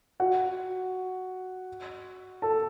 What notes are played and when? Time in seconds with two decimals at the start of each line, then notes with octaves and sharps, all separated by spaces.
0.20 F#4 F#5
2.42 A4 A5